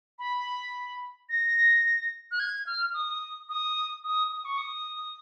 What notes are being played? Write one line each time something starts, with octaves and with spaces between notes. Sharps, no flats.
B5
A#6
F#6
G#6
F6
D#6
D#6
D#6
D#6
C#6
D#6